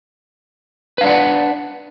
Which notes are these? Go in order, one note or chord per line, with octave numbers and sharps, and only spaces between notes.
D4 B4 D5 F5 F#5